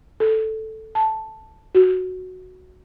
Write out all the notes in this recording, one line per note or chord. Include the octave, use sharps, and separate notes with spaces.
A4
A5
F#4